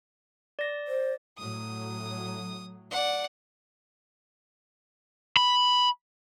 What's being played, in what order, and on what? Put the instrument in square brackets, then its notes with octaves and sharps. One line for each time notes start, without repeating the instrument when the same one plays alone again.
[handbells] D5 A#6
[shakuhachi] C5
[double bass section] A2 F#3 [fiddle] D#6
[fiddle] D5 F#5
[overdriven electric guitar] B5